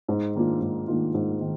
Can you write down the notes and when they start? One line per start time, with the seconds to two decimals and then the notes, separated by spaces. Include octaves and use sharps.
0.08 G#2
0.34 D#3 A#3 D4 F4
0.61 G#2
0.88 D#3 A#3 D4 F4
1.14 G#2
1.41 D#3